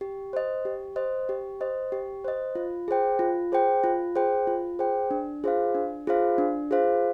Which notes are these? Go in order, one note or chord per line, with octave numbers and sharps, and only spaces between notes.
G4
C5 D#5
G4
C5 D#5
G4
C5 D#5
G4
C5 D#5
F4
G#4 C5 G5
F4
G#4 C5 G5
F4
G#4 C5 G5
F4
G#4 C5 G5
D4
F4 G#4 C5 F5
D4
F4 G#4 C5 F5
D4
F4 G#4 C5 F5